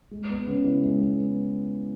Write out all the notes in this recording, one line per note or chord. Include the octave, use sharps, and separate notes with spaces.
G#3
B3
C#3
E4
G#3
B3